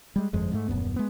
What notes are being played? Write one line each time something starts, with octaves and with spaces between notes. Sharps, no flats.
G3 G#3
G1 F2 F3 G#3
G#2 G3 A3
D#1 A#1 F#2 B3
G#3 B3